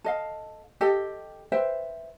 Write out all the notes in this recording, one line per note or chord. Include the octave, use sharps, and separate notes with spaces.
A4 D#5 F5
G4 A4 D#5 G5
B4 C5 E5 G5